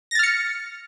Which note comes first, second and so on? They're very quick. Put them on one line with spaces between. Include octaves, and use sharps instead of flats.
A#6 A6 F6 C#7